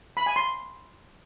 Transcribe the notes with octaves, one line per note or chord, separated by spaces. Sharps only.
B5
G#5
C6